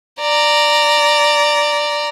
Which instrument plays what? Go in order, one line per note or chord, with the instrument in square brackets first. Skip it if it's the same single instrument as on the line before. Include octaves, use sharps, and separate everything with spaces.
[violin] D5 A#5